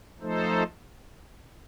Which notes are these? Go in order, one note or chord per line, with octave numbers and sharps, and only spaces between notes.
F3 A3 D#4 A4 C5